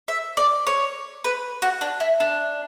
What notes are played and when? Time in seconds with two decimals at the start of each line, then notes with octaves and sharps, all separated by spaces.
0.08 E5
0.37 D5
0.67 C#5
1.24 B4
1.62 F#4
1.81 D4
2.00 E4
2.20 D4